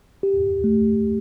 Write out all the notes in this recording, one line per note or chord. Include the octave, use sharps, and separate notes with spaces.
G4
A3